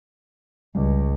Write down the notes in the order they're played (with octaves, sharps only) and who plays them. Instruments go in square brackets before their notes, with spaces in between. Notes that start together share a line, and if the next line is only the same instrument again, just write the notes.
[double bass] C#2 [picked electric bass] G3